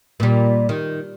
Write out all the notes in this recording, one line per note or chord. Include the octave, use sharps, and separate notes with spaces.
A#2 G3
D#3